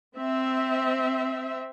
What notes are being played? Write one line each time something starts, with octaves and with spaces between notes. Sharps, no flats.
C4 E5